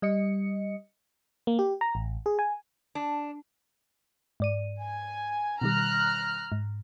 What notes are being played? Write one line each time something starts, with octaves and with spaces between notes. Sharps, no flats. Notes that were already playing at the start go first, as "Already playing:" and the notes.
G3 D#5 C#7
A#3
G4
A#5
A1
G#4
G#5
D4
G#2 D5 D#7
G#5
B2 D#3 G3 A#5 F6 F#6
G#2